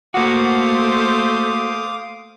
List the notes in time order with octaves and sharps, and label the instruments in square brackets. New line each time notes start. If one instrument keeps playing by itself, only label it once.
[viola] A3 C5 [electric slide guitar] A#3 F#4 [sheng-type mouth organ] F5 D6 D#6